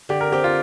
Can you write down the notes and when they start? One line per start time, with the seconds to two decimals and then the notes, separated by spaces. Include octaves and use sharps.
0.09 D3 G4
0.21 A#4
0.32 C4 G4
0.44 F4